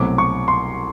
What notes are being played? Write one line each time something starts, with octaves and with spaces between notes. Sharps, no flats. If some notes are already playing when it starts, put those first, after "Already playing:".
Already playing: C2 B2 F#3 A3 C4 D6
C#6
C6